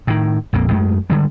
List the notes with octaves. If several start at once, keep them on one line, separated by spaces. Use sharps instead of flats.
A2 D#3
A#1 F2 F3 A#3
F#2 G#3 A3
D3 G3 G#3